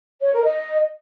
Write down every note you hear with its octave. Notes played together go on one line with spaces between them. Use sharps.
C#5
A#4
D#5